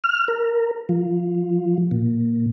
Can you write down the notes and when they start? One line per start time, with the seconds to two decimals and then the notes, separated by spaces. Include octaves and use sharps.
0.04 F6
0.28 A#4
0.89 F3
1.91 A#2